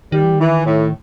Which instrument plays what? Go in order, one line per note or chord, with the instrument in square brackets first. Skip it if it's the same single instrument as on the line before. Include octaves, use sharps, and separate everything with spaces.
[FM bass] D#3 [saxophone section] G3
[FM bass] E3
D#3
[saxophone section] E3
A2